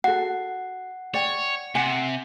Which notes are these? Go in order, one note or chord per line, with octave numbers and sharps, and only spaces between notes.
F#4 A4 F#5
C#5 D5 G5
C3 F#5 G#5